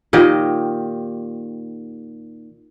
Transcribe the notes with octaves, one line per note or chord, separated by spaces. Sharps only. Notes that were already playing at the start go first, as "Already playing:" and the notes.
A#2 D#3 G4 D#5